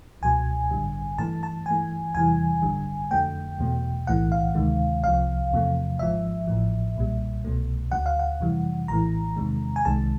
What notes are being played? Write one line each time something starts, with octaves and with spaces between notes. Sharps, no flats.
C#2 B2 F#3 G#5
A1 G2 D3 G3
G2 E3 A3 A5
A5
G2 E3 A3 G#5
E2 C3 E3 G3 G#5
G#1 F#2 D3 G3
F2 D3 F#3 A3 G5
E2 B2 F#3 A3
B1 A2 E3 A3 F#5
F5
D2 C3 D#3 G#3
C2 C3 F3 F5
E2 C3 F3 A3
G#1 G#2 F3 E5
A1 A2 F3
B1 A#2 G3
C2 B2 F#3 A3
D2 C#3 F#3 F#5
F5
F#5
F2 C3 E3 G3
A#1 A2 E3 A3 A#5
E2 C3 D#3 G#3
G#5
C2 C3 D#3 G#3 A5